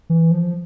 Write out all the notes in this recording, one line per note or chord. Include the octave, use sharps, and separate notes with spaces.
E3
F3